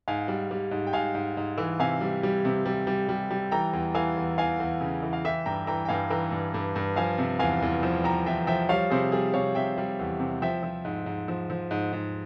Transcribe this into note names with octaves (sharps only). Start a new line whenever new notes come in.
G#2 F5 G#5
G3
G3
G#2
G5
G#2 F5 G#5
G#2
G#2
E3
C3 F5 G#5
G3
G3
C3
G3
G3
G3
G3
E3 G5 A#5
E2
E3 F5 G#5
E2
E2 F5 G#5
E2
C#3
E3
F5
E3 E5 G5
G2 G5 A#5
E3 G5 A#5
G5
G2 F5 G#5
E3 G5 A#5
G2
G2
G2
F3 F5 G#5
C3
E2 F5 G#5
E2
F3
F3 G5 A#5
E2 E5 G5
F3 E5 G5
G3 C#5 F5
C3 G#4 C5
G3 G#4
C3 C#5 F5
C3 E5 G5
G3
E2
C3
F3 E5 G5
F3
G#2
G#2
F3
F3
G#2
G#2